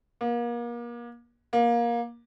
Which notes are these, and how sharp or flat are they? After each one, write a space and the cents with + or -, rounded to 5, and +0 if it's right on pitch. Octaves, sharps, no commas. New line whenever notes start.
A#3 +35
A#3 +20